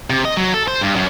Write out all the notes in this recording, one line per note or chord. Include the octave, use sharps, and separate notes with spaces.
C3
D#5
F#3
A4
C5
G2
F#2